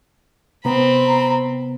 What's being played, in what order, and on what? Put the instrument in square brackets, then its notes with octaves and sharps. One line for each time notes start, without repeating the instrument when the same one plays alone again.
[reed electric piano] C3 B3 [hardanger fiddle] C4 B5 [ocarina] A#5